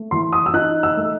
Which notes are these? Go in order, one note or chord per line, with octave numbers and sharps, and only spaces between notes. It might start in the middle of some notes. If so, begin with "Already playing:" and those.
Already playing: A3
E3 C6
D#6
E6
D#4 F#6
E6
A3